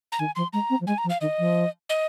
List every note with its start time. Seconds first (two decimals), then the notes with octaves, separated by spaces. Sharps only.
0.12 A#5
0.19 D#3 G#5
0.36 F3 C6
0.53 G#3 A#5
0.70 C4
0.80 F3
0.87 G#3 G#5
0.98 A#5
1.04 F3
1.10 F5
1.21 D#3 D#5
1.39 F3
1.89 D#5